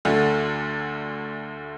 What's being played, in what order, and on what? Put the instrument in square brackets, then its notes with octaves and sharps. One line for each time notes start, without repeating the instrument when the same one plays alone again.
[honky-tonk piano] D2 D3 A3